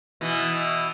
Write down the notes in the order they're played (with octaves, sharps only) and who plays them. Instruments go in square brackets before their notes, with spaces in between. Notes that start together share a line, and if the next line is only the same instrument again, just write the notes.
[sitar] B2 E3